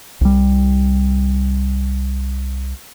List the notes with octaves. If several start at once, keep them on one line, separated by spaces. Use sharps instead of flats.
C2 G3